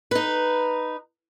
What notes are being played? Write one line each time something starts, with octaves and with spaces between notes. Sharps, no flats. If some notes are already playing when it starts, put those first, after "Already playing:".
D#4 B4